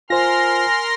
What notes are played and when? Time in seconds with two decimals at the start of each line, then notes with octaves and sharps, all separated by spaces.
0.10 F4 A#4 C5 G#5 C6 F6 A#6